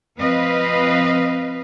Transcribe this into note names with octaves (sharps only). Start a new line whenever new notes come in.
F3 C4 B4 D#5 F5